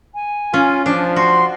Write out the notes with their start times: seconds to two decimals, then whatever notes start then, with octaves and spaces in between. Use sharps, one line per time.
0.14 G#5
0.54 C#4 F4
0.86 F3 D4
1.16 F#4 C6